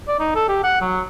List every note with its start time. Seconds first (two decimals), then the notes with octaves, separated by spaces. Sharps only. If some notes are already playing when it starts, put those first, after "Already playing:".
0.08 D5
0.19 D#4
0.35 A4
0.49 G4
0.64 F#5
0.81 F#3